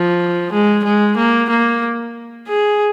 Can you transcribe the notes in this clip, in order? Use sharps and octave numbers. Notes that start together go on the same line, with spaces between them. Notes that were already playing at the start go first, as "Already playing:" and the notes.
Already playing: F3
G#3
G#3
A#3
A#3
G#4